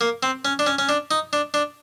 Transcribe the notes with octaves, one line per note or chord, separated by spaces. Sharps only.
A#3
C4
C#4
D4
C#4
C#4
D4
D#4
D4
D4